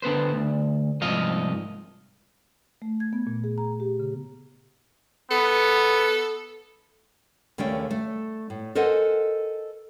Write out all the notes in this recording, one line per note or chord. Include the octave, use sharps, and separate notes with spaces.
D3 B3 B4 C5
D2
C2 G#2 F3 D#5 F5
A3
G#6
B3
A#2
G#4
A#5
G4
C#3
B3 A4
D#2 C#3 A3 C#4 D5 G5
A3
A2
A4 A#4 C5 D#5 F#5 G#5